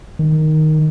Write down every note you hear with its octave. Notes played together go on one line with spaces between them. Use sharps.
D#3